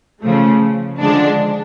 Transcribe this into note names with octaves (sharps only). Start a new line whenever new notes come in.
C#3 F3 A3
D3 F3 G#3 D4